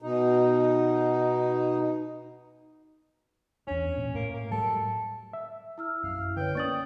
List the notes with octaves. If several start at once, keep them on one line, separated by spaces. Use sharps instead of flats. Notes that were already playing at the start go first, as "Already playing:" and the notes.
B2 D#4
E2 C#4 D4
A#2
A2 A#3
A#3
A2 F#3 G3 A4
E5
E4 E6 F6
A#1 F#2 F5
D3 B4 C#5 G5
A#3 C#4 D5 C#6 D#6 A6 F#7